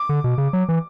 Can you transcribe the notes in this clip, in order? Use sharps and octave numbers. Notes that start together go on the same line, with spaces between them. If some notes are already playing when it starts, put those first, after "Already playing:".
Already playing: D6
D3
B2
C#3
F#3
E3